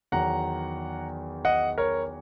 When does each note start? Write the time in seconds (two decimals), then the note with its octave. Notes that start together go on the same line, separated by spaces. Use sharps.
0.12 E2 D#3 F#3 F#5 A#5
1.45 D#5 F#5
1.78 A#4 C#5